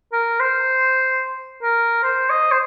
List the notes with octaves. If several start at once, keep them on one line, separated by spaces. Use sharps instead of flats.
A#4
C5
A#4
C5
D#5
C5